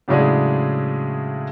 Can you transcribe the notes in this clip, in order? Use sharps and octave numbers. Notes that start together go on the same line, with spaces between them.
A2 C#3 F#3 G#3 D4 G#4